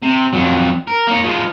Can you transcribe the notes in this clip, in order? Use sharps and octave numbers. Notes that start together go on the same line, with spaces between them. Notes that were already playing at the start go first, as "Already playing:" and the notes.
C3
F2 F#3
A#4
A#3 C#5
F3 G#3